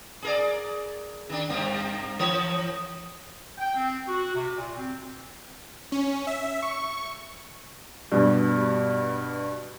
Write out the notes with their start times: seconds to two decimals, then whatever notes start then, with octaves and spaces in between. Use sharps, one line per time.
0.22 G#4 A#4 D5
1.30 D#3 D4
1.50 G2 C3 A#3
2.19 E3 A#4 C#5
3.58 G5
3.74 C4
4.07 F#4
4.34 C3
4.56 A#2
4.77 C4
5.92 C#4
6.27 E5
6.62 C#6
8.12 G2 B2 G3